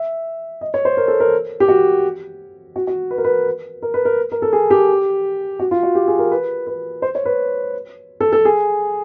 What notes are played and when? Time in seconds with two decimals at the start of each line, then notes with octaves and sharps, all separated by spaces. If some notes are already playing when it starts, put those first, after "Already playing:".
Already playing: E5
0.61 D#5
0.74 C#5
0.85 C5
0.97 A#4
1.08 A4
1.20 A#4
1.60 G4
1.68 F#4
2.76 F#4
2.87 F#4
3.11 B4
3.18 A#4
3.24 B4
3.82 A#4
3.94 B4
4.05 A#4
4.32 A#4
4.42 A4
4.53 G#4
4.70 G4
5.59 F#4
5.71 F4
5.83 F#4
5.95 G4
6.08 G#4
6.19 A#4
6.31 B4
6.67 B4
7.02 C5
7.15 C#5
7.25 B4
8.20 A4
8.32 A4
8.45 G#4